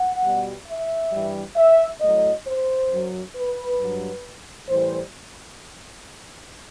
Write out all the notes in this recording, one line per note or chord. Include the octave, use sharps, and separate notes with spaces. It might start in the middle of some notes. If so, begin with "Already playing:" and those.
Already playing: F#5
B2 G3
E5
G2 E3 G3
E5
A2 F#3 D#5
C5
F#2 F#3
B4
G2 F#3
A2 E3 G3 C5